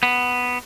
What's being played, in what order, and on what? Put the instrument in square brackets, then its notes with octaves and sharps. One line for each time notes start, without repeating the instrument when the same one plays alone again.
[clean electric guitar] B3